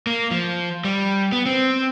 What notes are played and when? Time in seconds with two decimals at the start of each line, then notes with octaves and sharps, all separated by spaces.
0.07 A#3
0.31 F3
0.84 G3
1.32 B3
1.46 C4